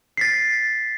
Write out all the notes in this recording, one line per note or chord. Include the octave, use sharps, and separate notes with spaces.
A6 B6 C7